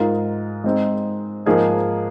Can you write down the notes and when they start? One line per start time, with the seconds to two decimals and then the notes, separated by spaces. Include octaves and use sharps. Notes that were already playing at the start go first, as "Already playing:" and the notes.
Already playing: G#2 G#3 F4 A#4
0.64 G#3 C4 D#4
1.46 G#2 F3 A#3 D#4 G#4